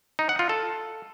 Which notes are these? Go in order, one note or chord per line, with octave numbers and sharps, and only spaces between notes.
D#4
F#5
F4
A4